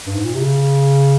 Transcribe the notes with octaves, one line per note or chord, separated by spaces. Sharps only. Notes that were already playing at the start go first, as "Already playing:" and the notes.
G2
G#2
A#2
C3
C#3